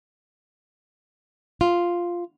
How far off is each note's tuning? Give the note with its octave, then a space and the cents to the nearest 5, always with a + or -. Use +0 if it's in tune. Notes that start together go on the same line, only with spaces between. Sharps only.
F4 +0